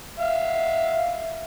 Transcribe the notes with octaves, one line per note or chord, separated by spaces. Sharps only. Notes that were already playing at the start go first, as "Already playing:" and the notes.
E5 F5